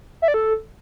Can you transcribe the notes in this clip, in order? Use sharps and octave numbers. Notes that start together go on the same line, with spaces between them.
E5
D5
A4